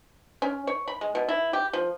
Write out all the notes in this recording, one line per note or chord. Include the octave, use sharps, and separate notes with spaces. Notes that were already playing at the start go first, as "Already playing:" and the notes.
C#4
C#5
B5
G#3
B2
E4
G4
F3